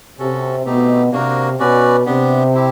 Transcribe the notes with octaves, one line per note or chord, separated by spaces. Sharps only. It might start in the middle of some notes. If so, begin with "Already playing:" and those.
C3 C#4 F#4 A4
B2 A3 C4 D#4 G4
C3 A#3 D4 F#4 A#4
B2 C#4 F#4 B4 D5
C3 B3 D4 G4
C4 E4 G4